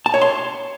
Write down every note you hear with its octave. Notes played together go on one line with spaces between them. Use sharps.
A5
C#5
C6